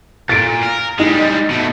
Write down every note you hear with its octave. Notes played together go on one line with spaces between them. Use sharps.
A#2 A6 D7
A#4
G3 G#3 D#4
B2 A3